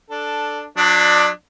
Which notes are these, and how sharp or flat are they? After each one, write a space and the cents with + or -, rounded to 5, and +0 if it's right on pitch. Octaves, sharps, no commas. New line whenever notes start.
D4 +0 A4 +0
F#3 -25 D4 +20 D5 +20